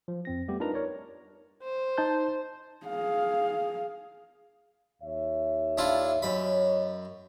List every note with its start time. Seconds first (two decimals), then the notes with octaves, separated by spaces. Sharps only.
0.08 F3
0.25 F2 C4 A#6
0.48 G3 A3 B3 G4
0.60 D4 D#4 F4 A#4 B4 A#5
0.74 A#4 C#5 D5
1.63 C5
1.98 D#4 A5 G6
2.87 G#4 F5
5.03 D#2 C#5 E5
5.78 D4 E4 F4
6.22 F#2 C#5 D#5 B5